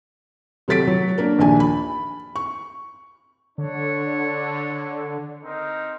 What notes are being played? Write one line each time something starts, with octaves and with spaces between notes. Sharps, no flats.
C3 F#3 A4 A6 B6 D7
F#3
A#3 D4 A#4
A#1 D#2 D4 G#5
B5
C#6
D3 D4 C#5
C4 D#4 A#4